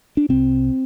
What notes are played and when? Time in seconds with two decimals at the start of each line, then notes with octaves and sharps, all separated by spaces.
0.17 D4
0.29 C2 C3 C4